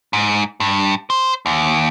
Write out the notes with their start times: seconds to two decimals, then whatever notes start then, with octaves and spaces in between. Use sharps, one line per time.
0.13 G#2
0.60 G2
1.10 C5
1.46 D#2